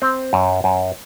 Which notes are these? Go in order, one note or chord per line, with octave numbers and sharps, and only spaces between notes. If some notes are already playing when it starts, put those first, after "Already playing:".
C4
F#2
F#2